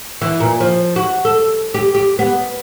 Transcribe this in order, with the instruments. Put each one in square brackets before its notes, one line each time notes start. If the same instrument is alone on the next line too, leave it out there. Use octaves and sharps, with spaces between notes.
[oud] E3
A#2
F3
F#4
A4
G4
G4
B3